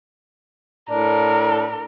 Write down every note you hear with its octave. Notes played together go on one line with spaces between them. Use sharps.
A2 D4 A#4